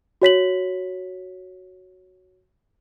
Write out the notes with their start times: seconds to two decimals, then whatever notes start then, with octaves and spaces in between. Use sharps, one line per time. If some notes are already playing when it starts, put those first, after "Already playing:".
0.22 F#4 C#5 B6 F#7